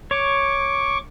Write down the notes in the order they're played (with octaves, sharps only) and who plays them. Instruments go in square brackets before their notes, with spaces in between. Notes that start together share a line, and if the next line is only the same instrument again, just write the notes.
[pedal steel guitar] C#5 [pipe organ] C#6 D6